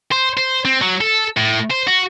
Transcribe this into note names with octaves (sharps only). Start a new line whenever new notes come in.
C5
C5
C4
F#3
A4
A2
C5
F#4